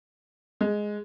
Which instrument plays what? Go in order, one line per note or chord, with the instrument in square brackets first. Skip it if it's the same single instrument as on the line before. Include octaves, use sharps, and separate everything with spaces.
[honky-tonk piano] G#3